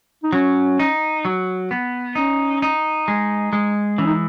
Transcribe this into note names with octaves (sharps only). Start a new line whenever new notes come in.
D#4
F#3 C#4
D#4
F#3
B3
C#4 D#4
D#4
G#3
G#3
E3 C#4
D#4